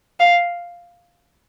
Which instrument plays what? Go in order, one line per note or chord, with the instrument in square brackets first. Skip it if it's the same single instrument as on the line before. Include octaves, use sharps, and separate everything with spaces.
[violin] F5